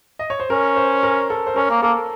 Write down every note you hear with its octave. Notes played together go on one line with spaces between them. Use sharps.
D#5
C#5
C5
C#4 A#4
C5
A#4
A4
C5
C#4 A#4
A#3
A#3 A4